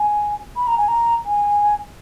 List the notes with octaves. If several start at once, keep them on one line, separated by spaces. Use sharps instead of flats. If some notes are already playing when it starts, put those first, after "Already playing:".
Already playing: G#5
B5
A#5
G#5
A#5
G#5